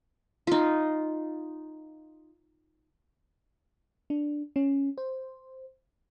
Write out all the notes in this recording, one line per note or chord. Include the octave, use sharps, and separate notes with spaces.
D#4 F4
D4
C#4
C5